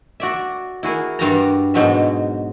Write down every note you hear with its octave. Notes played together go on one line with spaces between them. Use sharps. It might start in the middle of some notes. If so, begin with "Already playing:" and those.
F#4 D5 E5
E4 F#4 G#4 A#4
G2 G3 F#4 E5 A5 A#5
G#2 B2 F#3 G#3 F#4 E5